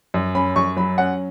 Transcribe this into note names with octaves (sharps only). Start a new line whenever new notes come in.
F#2
C#4 B5
F#2 C#6
F#3 B5
C#4 F#5